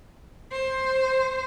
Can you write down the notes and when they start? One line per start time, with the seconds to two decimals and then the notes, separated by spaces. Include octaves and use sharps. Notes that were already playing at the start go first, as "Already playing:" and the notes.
0.52 C5